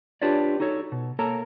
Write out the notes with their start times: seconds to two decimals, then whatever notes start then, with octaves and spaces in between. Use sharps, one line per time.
0.22 D4 F4 G4 B4 C#5 D5
0.60 D#4 F#4 A4 C#5
0.92 B2
1.19 A#3 A4 A#4 C#5 A5 A#5